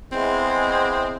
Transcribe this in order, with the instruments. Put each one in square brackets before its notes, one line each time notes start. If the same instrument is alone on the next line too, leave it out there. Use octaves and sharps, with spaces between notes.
[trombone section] E2 G#3 [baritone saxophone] C4